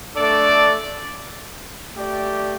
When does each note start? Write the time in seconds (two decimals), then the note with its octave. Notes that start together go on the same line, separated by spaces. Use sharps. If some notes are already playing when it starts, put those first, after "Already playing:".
0.15 A3 D4 A4 D5
1.96 A3 G4 D5